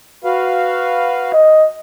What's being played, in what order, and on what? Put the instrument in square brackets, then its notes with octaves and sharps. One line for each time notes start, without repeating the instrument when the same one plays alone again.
[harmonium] F#4 B4 F5
[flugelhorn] D#5